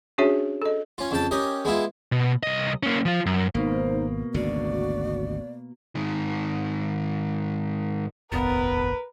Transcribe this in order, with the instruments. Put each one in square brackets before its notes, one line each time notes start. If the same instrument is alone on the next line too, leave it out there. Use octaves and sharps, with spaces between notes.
[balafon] C#4 D4 F#4 G#4 C#5 E5
A4 D#5
[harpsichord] C#4 F4
F2 C#3 G5 A5
C#4 G4 A#4 D#5
G#3 B3 E4 F4
[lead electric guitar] B2
C2 D#5
A#3 C#4
F3 F4
F#2
[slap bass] G#1 [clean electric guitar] B2 A#3 [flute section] D#4 A#4 C5
[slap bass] G#1 D2 C#3 [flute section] F#4 [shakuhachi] D5
[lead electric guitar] G#2 D#3
[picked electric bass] F1 A#1 D#2 [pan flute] B3 [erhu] A#4 [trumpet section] B4